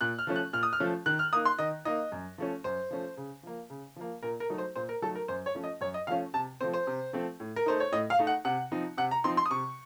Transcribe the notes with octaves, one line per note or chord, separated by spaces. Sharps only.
A#2 F#6
F6
F3 A3 C#4
F#6
A#2 F6
D#6
F6
F3 A3 C#4
D#3 F#6
F6
A#3 D#4 D#6
C6
D#3 D#5
A#3 D#4 D#5
F#2
F3 A3 C#4
F#2 C5
F3 A3 C#4
C#3
F3 A#3
C#3
F3 A#3
A#2 A#4
A#4
F#3 A3 D#4
C5
A#2 C5
A#4
F#3 A3 D#4 A4
A#4
F#2 C5
C#5
F3 A3 C#4
D#5
F#2 C#5
D#5
F3 A3 C#4 F5
C3 A5
F3 A3 C4 C5
C5
C3
F3 A3 C4
A2
A#4
A3 D#4 C5
C#5
A2 D#5
F5
A3 D#4
F#5
C3 F#5
F3 C4 D#4
C3 F#5
A#5
F3 C4 D#4 C6
C6
D#6
C3 C#6